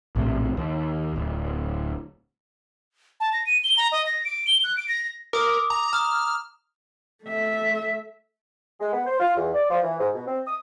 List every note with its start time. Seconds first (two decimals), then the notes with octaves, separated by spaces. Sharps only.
0.16 A#1 A2 C3
0.57 D#2
1.16 D1
3.20 A5
3.33 A#6
3.46 D#7
3.64 G7
3.77 A#5
3.92 D#5
4.06 A#6
4.25 D7
4.47 G7
4.64 F#6
4.77 D7
4.88 A#6
5.33 A#4 D6 D#6
5.70 A#5
5.93 A#5 D#6 F6
7.24 A3 E5
8.80 G#3
8.93 B3
9.06 C5
9.20 F4
9.36 E2
9.54 D5
9.70 F3
9.83 E3
10.00 G#2
10.14 B2
10.27 C4
10.47 D#6